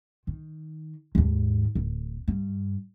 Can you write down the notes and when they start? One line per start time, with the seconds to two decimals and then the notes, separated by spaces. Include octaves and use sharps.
0.27 D#3
1.15 D#2 G#2
1.75 D1
2.28 G2